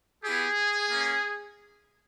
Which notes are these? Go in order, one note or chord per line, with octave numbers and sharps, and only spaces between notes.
B3 E4 G4 G#4
A#3 C#4